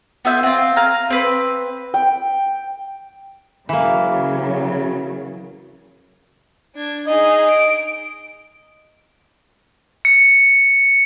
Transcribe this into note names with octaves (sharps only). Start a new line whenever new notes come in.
B3 F4 E5 G6
C4 F4
F5 G#5 A#5
C4 B4
G5
C#3 E3 F#3 A#3
D4 G#6
D#4 G#4 D#5
D7
C#7